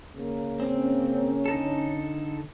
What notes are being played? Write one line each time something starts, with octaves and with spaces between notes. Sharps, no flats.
C#3 A#3
C4 C#4
D3 D#4 A4